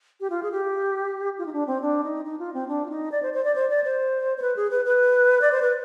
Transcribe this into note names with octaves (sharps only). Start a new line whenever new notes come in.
G4
F4
G#4
G4
F4
D#4
D4
C4
D4
D#4
D#4
F4
C4
D4
F4
D#4
D5
C5
C5
D5
C5
D5
C5
C5
B4
G#4
B4
B4
D5
C5
B4